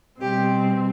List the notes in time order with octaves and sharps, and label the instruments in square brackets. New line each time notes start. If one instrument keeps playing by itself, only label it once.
[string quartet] B2 G3 C4 G4